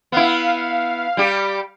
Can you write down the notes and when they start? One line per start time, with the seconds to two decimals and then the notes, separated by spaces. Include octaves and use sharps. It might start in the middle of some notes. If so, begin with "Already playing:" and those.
0.12 B3 E4 F5
1.17 G3 G4